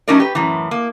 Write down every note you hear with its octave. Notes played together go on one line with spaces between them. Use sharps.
F#3 A3 C#4 D#4 A#4 D5
G4 B4
F#2 A2 E3
A#3